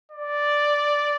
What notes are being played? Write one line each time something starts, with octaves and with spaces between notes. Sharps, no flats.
D5